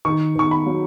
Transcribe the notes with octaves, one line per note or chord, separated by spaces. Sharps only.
D#3 C#6
D#3 C#6
B5
F#3